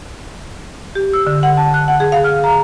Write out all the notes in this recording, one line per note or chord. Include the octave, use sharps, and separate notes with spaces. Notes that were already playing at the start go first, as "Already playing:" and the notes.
G4
E6
D3
F#5
A5
F#6
F#5
G#4
F5
F6
A#5